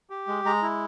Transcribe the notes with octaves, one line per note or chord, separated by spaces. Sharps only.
G4
G#3
G#3 A#5
E4